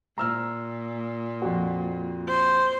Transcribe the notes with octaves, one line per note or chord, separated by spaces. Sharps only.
A#2 A#5 E6 F6
F2 F#4
C5